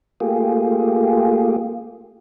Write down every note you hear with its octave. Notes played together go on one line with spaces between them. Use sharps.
A3 A#3 F4 G4 G#4